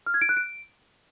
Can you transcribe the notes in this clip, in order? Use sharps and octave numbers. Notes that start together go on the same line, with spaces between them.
F6
G#6
D7
F#6
D7